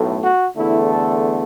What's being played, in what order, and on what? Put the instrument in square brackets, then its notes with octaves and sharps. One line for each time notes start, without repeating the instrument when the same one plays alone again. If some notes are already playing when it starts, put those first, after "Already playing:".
Already playing: [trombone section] B1 A2 A3
F#4
E2 D3 A3 E4
A4